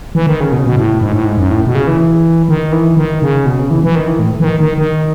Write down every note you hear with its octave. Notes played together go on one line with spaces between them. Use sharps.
E3
D#3
C#3
B2
C#3
B2
A2
G#2
A2
G#2
F#2
A2
B2
C#3
E3
D#3
E3
D#3
C#3
B2
C#3
E3
E3
D#3
E3
A2
E3
D#3
D#3
D#3